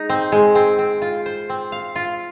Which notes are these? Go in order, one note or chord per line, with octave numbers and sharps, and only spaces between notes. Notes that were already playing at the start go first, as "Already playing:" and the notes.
Already playing: G#3 D#4
C4
G#3
C4
C4
F4
C5
C4
F5
F4